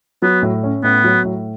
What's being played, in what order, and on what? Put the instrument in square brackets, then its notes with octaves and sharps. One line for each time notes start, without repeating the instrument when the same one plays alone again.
[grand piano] F#3 [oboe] B3
[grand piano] A2
C#4
[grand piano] A2 [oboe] B3
[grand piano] F#3
A2